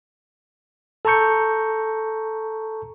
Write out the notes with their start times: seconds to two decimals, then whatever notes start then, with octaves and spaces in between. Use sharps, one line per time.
1.05 A4 A5 A#5 C#6 G6 C#7